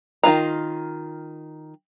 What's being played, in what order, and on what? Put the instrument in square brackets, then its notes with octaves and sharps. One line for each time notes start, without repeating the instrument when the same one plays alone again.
[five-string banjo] D#3 E3 F4 F5 A#5